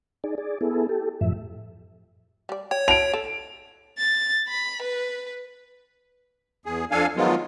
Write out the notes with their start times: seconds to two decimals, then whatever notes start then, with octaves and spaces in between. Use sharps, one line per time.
0.24 D#4 G#4 D5
0.38 G#4 D5
0.61 B3 E4 G#4 A4
0.89 G4 A4
1.21 F#2 A2 F3 E5
2.49 G3 D5
2.71 C#5 G5
2.88 E4 F#4 A5 D7 F7
3.13 A4
3.98 A6
4.48 B5
4.82 B4
6.65 E2 G#4
6.91 F2 D4 A4 F5 G#5
7.16 D#3 F3 F#3 G#3 B3 F4